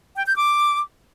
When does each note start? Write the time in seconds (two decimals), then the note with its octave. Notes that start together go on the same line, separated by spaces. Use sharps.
0.16 G5
0.25 G6
0.35 D6